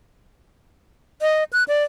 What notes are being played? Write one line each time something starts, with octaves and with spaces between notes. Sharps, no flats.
D#5
F#6
D5